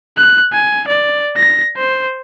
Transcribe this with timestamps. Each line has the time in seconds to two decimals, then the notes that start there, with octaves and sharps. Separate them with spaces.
0.17 F#6
0.52 G#5
0.88 D5
1.37 A#6
1.77 C5